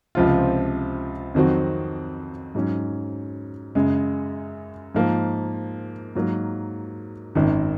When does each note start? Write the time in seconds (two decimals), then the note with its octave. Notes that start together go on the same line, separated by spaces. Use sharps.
0.15 C#2 C3 F3 C4 F4
1.34 F2 D#3 F#3 C4 F#4
2.55 G#2 F#3 C#4
3.75 F#2 C#3 G#3
4.94 G#2 F3 A#3
6.15 G#2 F#3 A#3
7.35 G#1 F#2 D#3